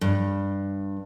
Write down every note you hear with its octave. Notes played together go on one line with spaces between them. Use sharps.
G2